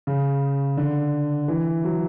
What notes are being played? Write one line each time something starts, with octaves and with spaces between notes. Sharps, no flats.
C#3
D3
E3
F#3